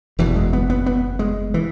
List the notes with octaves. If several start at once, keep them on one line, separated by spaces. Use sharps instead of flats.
F#1 E2 B2 E3
G#3
B3
B3
B3
G#3
E3